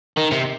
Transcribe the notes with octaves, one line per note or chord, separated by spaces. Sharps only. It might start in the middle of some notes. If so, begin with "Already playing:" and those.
D#3
C3